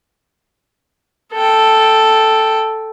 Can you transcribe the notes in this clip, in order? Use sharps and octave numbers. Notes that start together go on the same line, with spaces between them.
A4 G5